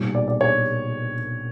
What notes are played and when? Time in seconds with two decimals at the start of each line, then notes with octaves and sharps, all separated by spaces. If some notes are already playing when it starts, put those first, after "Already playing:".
Already playing: B1 A#2 G3
0.15 D5
0.28 D5
0.41 C#5